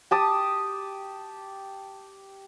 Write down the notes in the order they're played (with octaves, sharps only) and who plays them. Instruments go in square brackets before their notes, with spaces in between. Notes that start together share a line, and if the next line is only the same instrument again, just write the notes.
[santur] G4 A5 D#6